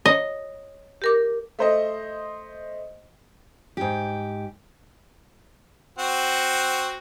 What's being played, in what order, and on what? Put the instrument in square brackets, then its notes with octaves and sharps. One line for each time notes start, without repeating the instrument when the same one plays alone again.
[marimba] C#5 [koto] D#5
[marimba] G4 A#4 D6
[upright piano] A3 C5 D#5
[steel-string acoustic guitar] G#2 G4
[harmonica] C4 F#4 F#5